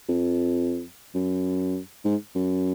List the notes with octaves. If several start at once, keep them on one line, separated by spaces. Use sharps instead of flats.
F2
F#2
G#2
F#2